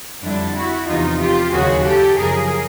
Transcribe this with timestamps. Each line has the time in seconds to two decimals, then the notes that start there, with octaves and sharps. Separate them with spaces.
0.23 F2 D3 G3 D4 E4
0.56 E4 F#4
0.88 E2 C3 F3 D#4 F4
1.20 F4 G4
1.52 D#2 C#3 F#3 F#4 G#4
1.85 G4 A4
2.17 F#2 C#3 F3 G#4 A#4